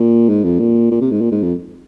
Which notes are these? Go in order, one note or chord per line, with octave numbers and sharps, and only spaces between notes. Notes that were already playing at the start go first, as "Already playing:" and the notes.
Already playing: A#2
G#2
F2
A#2
A#2
C3
G#2
A#2
G#2
F2